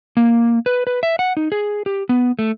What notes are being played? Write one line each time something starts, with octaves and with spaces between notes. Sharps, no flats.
A#3
B4
B4
E5
F#5
D#4
G#4
G4
B3
A3